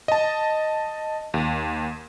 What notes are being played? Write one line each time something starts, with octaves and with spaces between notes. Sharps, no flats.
D#5 A5
D#2